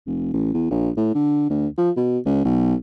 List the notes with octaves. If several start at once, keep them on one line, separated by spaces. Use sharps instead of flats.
F1
A1
E2
A#1
A2
D3
D2
F3
B2
C#2
B1